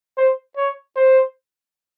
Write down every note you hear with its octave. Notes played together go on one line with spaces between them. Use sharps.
C5
C#5
C5